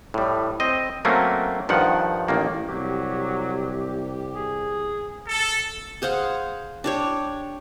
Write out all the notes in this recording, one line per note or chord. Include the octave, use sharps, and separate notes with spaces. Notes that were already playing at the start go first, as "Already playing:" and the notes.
A2 G3
C4 D#5
F#3 A3 A#3 C4 C#4
G2 D#3 F3 F#5
A1 D#3 A#3
C2 F#3 G4
G#4
A4
G#4 C5 F5 F#5
D4 G4 C#5